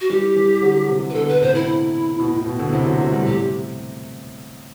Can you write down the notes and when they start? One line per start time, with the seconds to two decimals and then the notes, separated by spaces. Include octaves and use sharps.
0.01 F#4
0.10 E3 G3 G4
0.36 E3 G3
0.62 D3 F#3
0.88 C3 E3
1.10 B4
1.14 B2 D3 A4
1.29 B4
1.41 A2 C3 C5
1.55 E4
2.20 B2
2.33 A2
2.46 B2
2.59 B2 D3
2.73 C3 E3 E4
2.86 D3 F#3
2.99 F#3 A3 F#4
3.12 E3 G3
3.25 A2 C3 G4